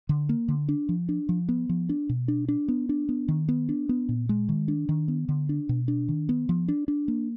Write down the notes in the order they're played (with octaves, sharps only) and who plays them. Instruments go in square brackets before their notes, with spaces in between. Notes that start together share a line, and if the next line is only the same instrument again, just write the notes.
[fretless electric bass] D3
A#3
D3
D4
F3
D4
F3
B3
F3
D4
B2
D4
D4
B3
D4
B3
D#3
B3
D4
B3
A#2
G#3
D#3
D4
D#3
B3
D3
D4
B2
D4
D#3
B3
F3
D4
D4
A#3